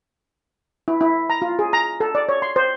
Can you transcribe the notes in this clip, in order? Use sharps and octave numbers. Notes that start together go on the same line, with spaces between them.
E4
E4
A#5
F4
G#4
A#5
A4
D5
C#5
C6
C5